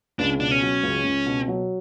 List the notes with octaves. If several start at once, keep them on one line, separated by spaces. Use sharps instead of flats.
C#2 D4
B2 D4
C#4
F#3
C#2
C#2
B2
F#3